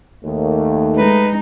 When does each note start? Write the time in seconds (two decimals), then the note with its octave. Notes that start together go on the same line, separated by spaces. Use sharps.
0.24 D#2 A3
0.97 G#3 D#4 B4